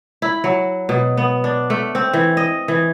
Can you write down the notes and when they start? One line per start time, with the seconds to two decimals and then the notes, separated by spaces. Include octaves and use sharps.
0.22 E4
0.44 F#3
0.89 B2
1.17 B3
1.44 D4
1.70 A3
1.95 C4
2.13 E3
2.37 D#5
2.68 E3